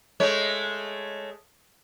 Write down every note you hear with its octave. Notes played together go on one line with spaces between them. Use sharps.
G#3 A3 C#5